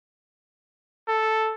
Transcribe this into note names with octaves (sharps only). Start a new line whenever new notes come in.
A4